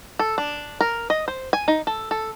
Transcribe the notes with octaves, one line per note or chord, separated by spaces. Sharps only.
A4
D4
A#4
D#5
C5
G#5
D#4
A4
A4